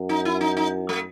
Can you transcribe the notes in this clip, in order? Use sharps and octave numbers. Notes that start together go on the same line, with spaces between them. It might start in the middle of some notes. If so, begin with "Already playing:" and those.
Already playing: F#2
D#4
E4
D#4
D#4
A3